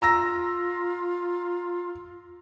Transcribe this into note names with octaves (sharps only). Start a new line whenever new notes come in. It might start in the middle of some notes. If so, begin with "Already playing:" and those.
F4 A#5 E6 A#6